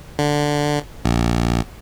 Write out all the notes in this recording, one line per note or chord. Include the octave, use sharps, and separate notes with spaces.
D3
A#1